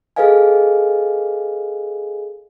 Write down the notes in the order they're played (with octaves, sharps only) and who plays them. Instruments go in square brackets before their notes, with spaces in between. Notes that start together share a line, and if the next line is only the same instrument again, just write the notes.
[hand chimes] G#4 A4 B4 D#5 F5 G#5